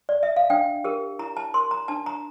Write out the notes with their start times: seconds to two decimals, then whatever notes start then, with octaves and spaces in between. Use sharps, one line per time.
0.09 D5
0.23 E5
0.36 F5
0.50 D4 G5
0.84 G4 A#4
1.19 E4 A#5
1.37 A5
1.54 A#4 C6
1.71 A#5
1.88 D4 A5
2.06 A#5